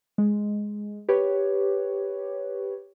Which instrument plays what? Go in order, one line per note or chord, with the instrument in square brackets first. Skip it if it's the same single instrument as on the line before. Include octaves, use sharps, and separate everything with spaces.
[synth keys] G#3
G4 B4 C#5